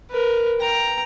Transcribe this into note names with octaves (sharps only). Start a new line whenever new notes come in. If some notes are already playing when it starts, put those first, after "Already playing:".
A#4 B4
G5 A#5